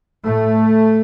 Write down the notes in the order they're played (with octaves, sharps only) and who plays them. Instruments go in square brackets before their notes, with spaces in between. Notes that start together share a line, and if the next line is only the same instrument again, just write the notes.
[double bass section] A2 A3